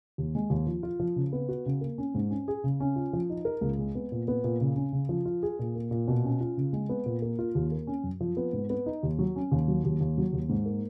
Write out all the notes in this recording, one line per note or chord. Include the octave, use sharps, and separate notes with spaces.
D#2
G#3
D#2
F3
F4
F3
C#3
B3
F#4
C#3
A#3
C#4
G#2
C#4
G#4
C#3
C#4
F4
F3
D#4
A#4
C#2
G#3
B3
A#2
B3
A#2
C#3
C#4
C#3
F3
F4
G#4
A#2
A#3
A#2
B2
C#4
F4
C#3
G#3
B3
A#2
A#3
F4
D#2
A#3
C#4
F#2
F3
B3
G#2
B3
D#4
D#2
F#3
C#4
D#2
F#3
D#2
D#2
F#3
D#2
G#2
A#3